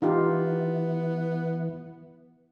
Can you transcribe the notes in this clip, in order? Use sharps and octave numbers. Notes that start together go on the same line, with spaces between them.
E3 B3 D#4 F4 G4